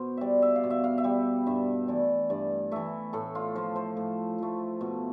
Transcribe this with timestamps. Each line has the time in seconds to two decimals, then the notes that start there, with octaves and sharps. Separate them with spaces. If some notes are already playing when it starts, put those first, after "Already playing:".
Already playing: B2 C5
0.17 G3 D5 E5
0.42 E5
0.56 F5
0.64 B2
0.70 E5
0.84 F5
0.98 E5
1.04 G3
1.47 G2 E5
1.88 E3 A3 D5
2.30 G2 D5
2.72 E3 A3 E5
3.13 A2 A4
3.35 F4
3.55 F3 A3 C5
3.76 C5
3.97 A2
4.38 F3 A3
4.81 B2